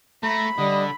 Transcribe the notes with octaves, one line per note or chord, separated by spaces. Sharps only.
A3 A#5 B5
D3 G3 D#5